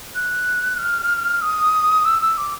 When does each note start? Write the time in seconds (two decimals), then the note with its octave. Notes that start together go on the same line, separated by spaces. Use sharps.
0.15 F#6
0.79 F6
1.42 D#6
2.05 E6
2.22 E6
2.37 D6